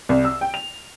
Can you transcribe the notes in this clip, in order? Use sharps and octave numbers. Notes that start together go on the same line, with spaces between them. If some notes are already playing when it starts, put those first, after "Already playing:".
C2
E6
G5
F7